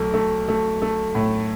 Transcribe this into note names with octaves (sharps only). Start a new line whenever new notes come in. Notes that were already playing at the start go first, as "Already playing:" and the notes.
Already playing: B1 A3
A3
A3
A3
A2